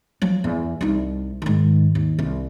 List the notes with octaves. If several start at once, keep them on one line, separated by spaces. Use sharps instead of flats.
F3 F#3
E2
C2 D#4
G#2 D#3
D#2
C2